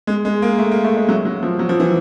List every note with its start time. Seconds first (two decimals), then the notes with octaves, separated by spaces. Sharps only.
0.07 G#3
0.25 G#3
0.42 A#3
0.58 A3
0.71 A#3
0.84 A3
0.96 G#3
1.09 F#3
1.25 F#3
1.43 F3
1.59 F#3
1.69 F3
1.80 E3